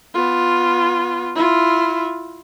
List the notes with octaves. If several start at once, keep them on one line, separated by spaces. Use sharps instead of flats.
B3 F4
E4 F4